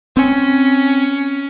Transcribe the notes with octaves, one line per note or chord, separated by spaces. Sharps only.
C4 C#4